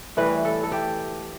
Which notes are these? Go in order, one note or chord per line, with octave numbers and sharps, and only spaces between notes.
A2 E3 G3 B4
A4
A4
G4